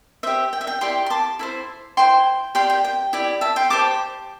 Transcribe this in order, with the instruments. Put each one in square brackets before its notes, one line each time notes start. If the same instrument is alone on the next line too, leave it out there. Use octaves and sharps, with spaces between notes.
[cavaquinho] G4 C5 E5
G5
E5
G5
E4 G4 D5 G5 C6
C6
A5 D6
E4 A4 C5
E4 C5 G5 C6
G4 D5 G5 C6
G5
G5
E4 G4 D5
E5 A5
G5 C6
G4 C5 A5 D6